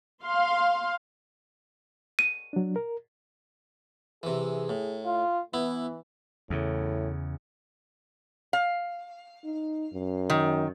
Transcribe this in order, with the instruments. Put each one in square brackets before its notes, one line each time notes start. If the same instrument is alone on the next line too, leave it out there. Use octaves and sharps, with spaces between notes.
[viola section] F5 C6
[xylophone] D#7
[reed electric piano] F#3 D4
A#4
[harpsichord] C3 E3 [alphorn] G#4
[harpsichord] A2
[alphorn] F4
[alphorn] E3 [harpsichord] B3 E4
[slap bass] E2 C#3 [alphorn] A2
[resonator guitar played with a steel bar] F5
[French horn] D#4
F#2
[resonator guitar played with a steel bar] D#3